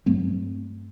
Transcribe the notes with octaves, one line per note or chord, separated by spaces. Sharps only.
G2 F#3 A3 C4